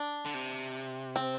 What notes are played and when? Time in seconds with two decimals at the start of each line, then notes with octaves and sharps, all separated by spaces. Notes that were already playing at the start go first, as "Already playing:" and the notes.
Already playing: D4
0.25 D3
0.34 C3
1.16 C4